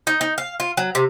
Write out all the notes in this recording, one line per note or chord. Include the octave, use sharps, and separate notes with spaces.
D#4
D#4
F5
F4
F#3
C3